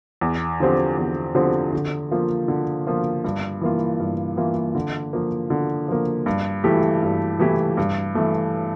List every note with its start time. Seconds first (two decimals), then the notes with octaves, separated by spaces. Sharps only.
0.21 E2
0.60 D3 F3 C4 G4
0.97 E2
1.35 D3 F3 C4 G4
1.73 D3
2.11 F3 A#3 F4
2.48 D3
2.87 F3 A#3 F4
3.24 G2
3.61 E3 A#3 F4
4.00 G2
4.37 E3 A#3 F4
4.75 D3
5.13 F3 A#3
5.50 D3
5.88 F3 A#3
6.26 G2
6.64 E3 A3 E4 G4
7.03 G2
7.40 E3 A3 E4 G4
7.77 G2
8.15 E3 A3